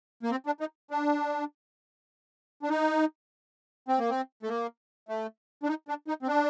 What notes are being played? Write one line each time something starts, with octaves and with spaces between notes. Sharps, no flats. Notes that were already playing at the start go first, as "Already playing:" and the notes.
A#3
C4
D4
D#4
D4
D4
D#4
C4
A#3
C4
A3
A#3
A3
D4
D#4
D4
D#4
C4
D4